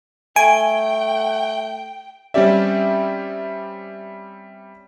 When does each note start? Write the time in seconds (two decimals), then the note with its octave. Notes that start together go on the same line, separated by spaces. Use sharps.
0.36 A3 G5 G#5 D7
2.34 G3 C4 C#4 G4 D5 E5